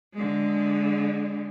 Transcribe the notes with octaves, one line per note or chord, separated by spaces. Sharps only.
D3 G#3